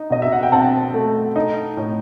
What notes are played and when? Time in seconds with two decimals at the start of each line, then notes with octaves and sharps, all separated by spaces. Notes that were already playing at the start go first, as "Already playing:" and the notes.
Already playing: D#4
0.10 B2 D#5
0.22 E5
0.32 F#5
0.43 G5
0.52 C4 F#5 A5
0.94 A3
1.36 D#4
1.77 A2